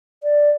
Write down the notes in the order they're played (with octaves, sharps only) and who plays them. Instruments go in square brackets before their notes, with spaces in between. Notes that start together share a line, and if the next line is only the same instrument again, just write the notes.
[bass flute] D5